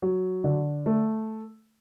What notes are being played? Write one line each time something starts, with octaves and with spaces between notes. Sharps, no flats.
F#3
D3
A3